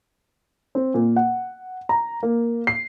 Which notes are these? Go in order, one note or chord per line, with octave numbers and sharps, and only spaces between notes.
C4
A#2
F#5
A#5
A#3
C7